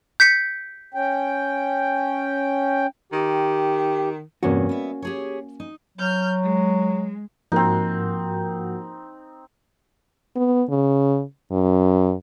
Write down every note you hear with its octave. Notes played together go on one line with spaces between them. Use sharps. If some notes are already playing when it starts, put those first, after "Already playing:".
G6 B6 C#7
C#4 G5
D#3 G4
E2 G2 C3 A#3 C#4 F#4
B3 E5
G4 G#4 C#5
D#4
F#3 F6 G6
G#3
G#2 F3 A#3 C4 D#4 F#4 A#4 F#5
B3
C#3
F#2